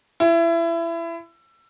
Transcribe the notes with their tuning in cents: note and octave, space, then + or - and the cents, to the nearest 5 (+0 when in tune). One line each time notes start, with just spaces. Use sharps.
E4 +25